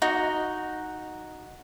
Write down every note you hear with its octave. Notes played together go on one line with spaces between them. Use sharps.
D#4 F#4